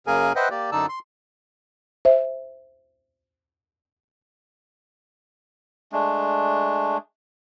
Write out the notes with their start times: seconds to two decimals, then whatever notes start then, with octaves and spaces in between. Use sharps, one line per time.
0.07 F#2 C#3 A#3 G#4 A#4 G#5
0.36 B4 C5 D#5 E5 F#5 G5
0.51 A#3 G4 D5
0.72 F#2 D3 D#4 D5 A5 E6
0.89 C6
2.05 C5 E5
5.92 G#3 A3 D4